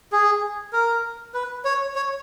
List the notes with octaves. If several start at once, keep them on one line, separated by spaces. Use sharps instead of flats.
G#4
A#4
B4
C#5
C#5